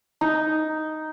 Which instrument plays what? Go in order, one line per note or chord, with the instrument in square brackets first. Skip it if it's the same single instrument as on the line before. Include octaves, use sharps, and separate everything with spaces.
[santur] D#4